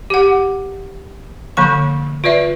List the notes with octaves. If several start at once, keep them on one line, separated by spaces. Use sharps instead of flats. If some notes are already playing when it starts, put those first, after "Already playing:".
G4 F#5
D3 F3 A#3 C#6
F4 B4 D5 E5